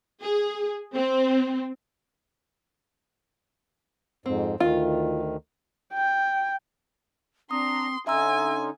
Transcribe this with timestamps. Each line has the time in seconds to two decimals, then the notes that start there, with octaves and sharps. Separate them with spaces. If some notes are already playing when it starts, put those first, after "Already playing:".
0.22 G#4
0.95 C4
4.26 F2 G#2 C4
4.60 D2 D#3 F4
5.94 G5
7.51 C4 D4 A#5 C6 D#6
8.07 D3 C#4 D#4 E5 G#5 A#5 C6 E6